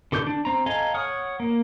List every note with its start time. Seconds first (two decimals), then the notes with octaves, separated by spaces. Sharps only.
0.12 D3 A4 D6 G6
0.27 D4
0.45 C4 A#5
0.66 A4 D#5 F5 G#5 A#5
0.94 C#5 F#5 D#6 F6
1.40 A#3